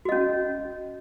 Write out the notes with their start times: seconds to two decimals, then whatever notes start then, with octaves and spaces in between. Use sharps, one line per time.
0.05 F#4
0.09 D#5
0.12 C#4